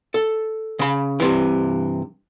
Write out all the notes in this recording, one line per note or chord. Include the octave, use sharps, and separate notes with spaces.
A4
C#3 B5
G2 C3 E3